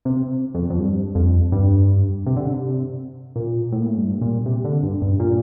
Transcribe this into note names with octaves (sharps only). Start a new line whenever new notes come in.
C3
F2
F2
G2
F2
G2
C3
D3
C3
A#2
A2
A#2
A2
G2
A#2
C3
D3
G2
G2
A#2